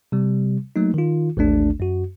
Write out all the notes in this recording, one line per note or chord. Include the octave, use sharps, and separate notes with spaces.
C3 G3
F#3 A3 A#3 D#4
D#3 F4
A1 D#2 A3 D4
F#2 F#4